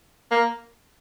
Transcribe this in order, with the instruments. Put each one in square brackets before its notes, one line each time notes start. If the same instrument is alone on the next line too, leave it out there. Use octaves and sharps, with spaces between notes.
[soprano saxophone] A#3